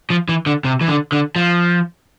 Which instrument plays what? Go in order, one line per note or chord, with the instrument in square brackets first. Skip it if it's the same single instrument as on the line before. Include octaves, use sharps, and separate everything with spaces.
[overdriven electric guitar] F3
E3
D3
C3
E3
D3
D3
F3